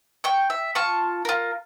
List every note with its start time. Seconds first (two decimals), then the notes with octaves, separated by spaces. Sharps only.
0.24 G5 C#6
0.50 E5
0.75 F4 A5 C#6
1.25 F4 A#4